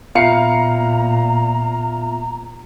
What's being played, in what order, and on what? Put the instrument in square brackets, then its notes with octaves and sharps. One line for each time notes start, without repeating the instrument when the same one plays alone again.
[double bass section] A#2 [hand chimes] B3 F4 E5 [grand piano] F5 C7 C#7 [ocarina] A#5